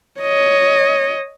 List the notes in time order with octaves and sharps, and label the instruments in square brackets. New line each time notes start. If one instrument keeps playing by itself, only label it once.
[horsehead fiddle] C#5 D#5